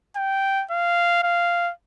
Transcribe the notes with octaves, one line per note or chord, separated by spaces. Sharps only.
G5
F5
F5